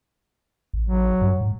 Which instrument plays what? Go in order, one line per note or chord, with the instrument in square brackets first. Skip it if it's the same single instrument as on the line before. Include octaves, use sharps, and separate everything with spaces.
[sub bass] A1
[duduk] F#3
[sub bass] G2
G#2